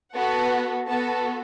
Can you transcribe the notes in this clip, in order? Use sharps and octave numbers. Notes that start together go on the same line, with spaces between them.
B3 F#4 A4 F#5
B3 F#4 A4 A5